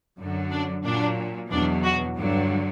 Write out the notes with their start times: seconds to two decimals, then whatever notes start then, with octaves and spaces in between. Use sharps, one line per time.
0.19 F#2 D3 F#3
0.51 D4
0.84 A#2 F#3 D4
1.51 E2 B2 F#3 D4
1.84 F#4
2.16 G2 D3 F#3